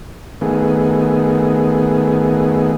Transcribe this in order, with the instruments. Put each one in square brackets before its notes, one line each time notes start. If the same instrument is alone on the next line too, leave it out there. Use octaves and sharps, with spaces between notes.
[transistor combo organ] D#3 A3 B3 G#4